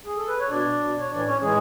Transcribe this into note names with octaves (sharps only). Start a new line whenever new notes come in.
G#4
A4
B4
C#5
B2 D4 D5
B2
C#5
A2 E3 D4 D5
C#4 C#5
A2 E3 G#3 G#4